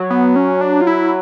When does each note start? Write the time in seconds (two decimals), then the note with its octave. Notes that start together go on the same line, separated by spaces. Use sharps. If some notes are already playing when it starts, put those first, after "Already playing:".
Already playing: F#3
0.10 B3
0.36 C#4
0.61 D4
0.81 F4
0.87 E4